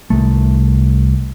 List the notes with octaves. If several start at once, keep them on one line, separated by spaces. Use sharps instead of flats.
C2 A3